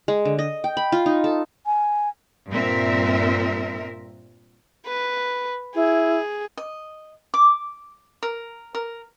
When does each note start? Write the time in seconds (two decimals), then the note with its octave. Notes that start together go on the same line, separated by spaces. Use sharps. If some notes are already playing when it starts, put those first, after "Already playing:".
0.08 G#3
0.25 D3
0.39 D#5
0.64 G5
0.77 B5
0.92 F4
1.06 D#4
1.24 A4
1.66 G#5
2.49 G2 A#2 C4 A#4 E5
4.87 B4
5.75 E4 G#4
6.57 D#5
7.34 D6
8.23 A#4
8.75 A#4